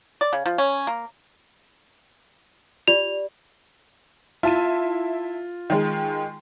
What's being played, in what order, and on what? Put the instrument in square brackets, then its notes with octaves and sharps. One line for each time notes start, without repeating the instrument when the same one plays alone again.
[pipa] D5
C#3
F3
C#4
A#3
[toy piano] F4 G4 D5 [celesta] F7
[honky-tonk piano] E4 A5 D#7 [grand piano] F4
[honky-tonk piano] D#3 G#3